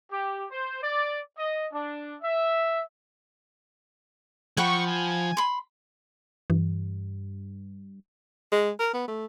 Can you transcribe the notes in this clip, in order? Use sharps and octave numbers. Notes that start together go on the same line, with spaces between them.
G4
C5
D5
D#5
D4
E5
F3 F#5 G5 B5 C#6
G#5
B5 C6
G2 E3
G#3
A#4
B3
A3